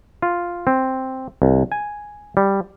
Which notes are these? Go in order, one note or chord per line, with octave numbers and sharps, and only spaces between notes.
F4
C4
C2
G#5
G3